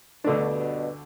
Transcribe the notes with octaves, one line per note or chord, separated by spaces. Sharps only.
D2 G2 B2 D3 A3 D4